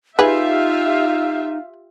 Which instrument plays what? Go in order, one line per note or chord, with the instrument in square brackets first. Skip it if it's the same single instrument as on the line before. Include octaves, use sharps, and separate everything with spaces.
[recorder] D#4 [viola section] F4 G4 E5 [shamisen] G#4 B4 [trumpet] F5